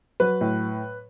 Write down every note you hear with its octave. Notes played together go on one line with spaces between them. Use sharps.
F#3 B4
A2